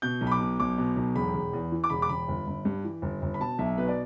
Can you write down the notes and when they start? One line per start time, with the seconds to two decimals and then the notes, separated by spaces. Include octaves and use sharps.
0.02 B2 G6
0.21 B1
0.27 B5
0.32 D6
0.40 B2
0.60 B1 D6
0.78 B2
0.96 B1
1.15 E1 B5
1.34 E1
1.53 E2
1.72 E3
1.84 D6
1.90 E1 B5
2.02 D6
2.09 E1 B5
2.28 G1
2.46 G1
2.65 G2
2.84 E3
3.02 G1
3.22 G1
3.34 B5
3.40 B2 A5
3.58 B1 E5
3.77 B2 B4
3.89 D5